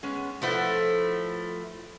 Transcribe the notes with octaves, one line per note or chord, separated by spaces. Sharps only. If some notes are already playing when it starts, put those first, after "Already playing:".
G#3 B3 C#4
F3 A3 E4 A4 B4 F#5